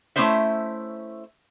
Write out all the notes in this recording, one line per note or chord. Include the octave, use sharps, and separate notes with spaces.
A3 C4 C#4 E4 C5 E5